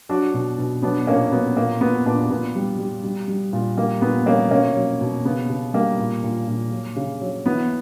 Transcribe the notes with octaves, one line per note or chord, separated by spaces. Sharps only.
F#3 D4 F#4
B2
B2
F#3 B3 D4
A#2 A#3 C#4
F#3 B3
A#2 A#3
A#2 B3
A#2 B3 D4
A#2 B3
G3
G3
G3
G3
A#2
G3 A#3
A#2 B3
G3 A#3 C#4
B2 A#3 C#4
F#3
B2
C#3 B3
C#3
G3 A#3
A#2
A#2
A#2
F#3
C#3
F#3
E3 B3